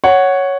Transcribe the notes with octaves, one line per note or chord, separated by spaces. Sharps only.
C#5 F#5